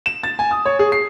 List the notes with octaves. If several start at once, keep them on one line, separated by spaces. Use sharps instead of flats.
E7
A6
G#5
D#6
C#5
G#4
C7